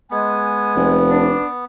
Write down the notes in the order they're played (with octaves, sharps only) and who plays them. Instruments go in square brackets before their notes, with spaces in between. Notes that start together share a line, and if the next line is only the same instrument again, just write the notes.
[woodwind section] G#3 G#5 [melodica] B3
[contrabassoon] F1 [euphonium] B4
[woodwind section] D4